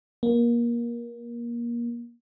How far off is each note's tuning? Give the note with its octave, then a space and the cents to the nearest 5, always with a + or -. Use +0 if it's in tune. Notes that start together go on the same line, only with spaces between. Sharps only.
A#3 +25